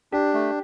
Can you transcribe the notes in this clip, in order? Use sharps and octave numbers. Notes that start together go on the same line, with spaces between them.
D4 G4
A3